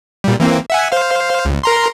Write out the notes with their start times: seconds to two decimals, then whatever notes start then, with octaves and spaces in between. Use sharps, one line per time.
0.24 A#2 G3
0.40 E3 A#3 C4
0.70 E5 F#5 G#5
0.92 C5 F5
1.45 C#2
1.63 A#4 A#5 C6